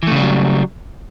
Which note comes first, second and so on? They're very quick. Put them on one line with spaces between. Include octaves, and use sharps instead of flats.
E3 A3 C#3 G3 F#3